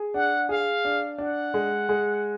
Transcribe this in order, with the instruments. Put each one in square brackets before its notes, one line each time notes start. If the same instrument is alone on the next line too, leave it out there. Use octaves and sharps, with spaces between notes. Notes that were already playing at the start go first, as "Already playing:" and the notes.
Already playing: [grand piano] G#4
[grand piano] D4 [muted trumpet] F#5
[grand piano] G#4 [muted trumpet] F5
[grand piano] D4
[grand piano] D4 [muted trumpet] F#5
[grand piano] G#3
G#3